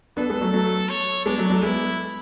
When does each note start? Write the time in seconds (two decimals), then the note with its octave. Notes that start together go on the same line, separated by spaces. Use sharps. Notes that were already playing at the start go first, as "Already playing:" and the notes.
0.17 B3 D4 A4
0.29 G#3 B3
0.41 F#3 A3
0.53 F#3 A3
0.89 C#5
1.26 G#3 B3 D4
1.38 F#3 A3
1.50 F#3 A3
1.62 G#3 B3 E4